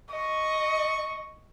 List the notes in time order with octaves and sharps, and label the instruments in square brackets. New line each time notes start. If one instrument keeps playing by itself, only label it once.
[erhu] D#5 [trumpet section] C#6